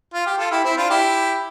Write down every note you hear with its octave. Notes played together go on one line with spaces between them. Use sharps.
F4
G4
F4 A4
E4 G4
C4 E4
D4 F4
E4 G4